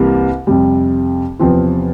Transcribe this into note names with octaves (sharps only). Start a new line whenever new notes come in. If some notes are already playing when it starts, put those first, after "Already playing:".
Already playing: C2 C3 E3 G3 A#3
F2 C3 G3
E2 C3 F3 C4 F4